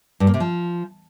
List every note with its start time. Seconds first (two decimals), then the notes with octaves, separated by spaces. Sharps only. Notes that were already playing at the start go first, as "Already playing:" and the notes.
0.20 G2
0.27 A#3
0.34 C3
0.40 F3